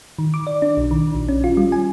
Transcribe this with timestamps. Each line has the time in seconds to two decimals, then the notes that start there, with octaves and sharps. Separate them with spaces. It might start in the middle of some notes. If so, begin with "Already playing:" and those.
0.19 D#3
0.34 D6
0.47 D5
0.62 D4
0.77 B1
0.91 D#3
1.15 A#1
1.29 C#4
1.44 F4
1.57 G3
1.72 G#5